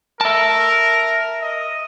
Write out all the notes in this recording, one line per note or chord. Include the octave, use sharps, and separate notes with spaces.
A#4 E5 A5
D#5